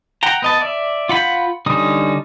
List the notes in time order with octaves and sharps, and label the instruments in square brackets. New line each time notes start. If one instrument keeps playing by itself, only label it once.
[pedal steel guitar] F#5 G5 A#5
B3 D#5 A5
D5 E5
F4 F#5 B5 G6
D3 G3 C#4 D#4 D#6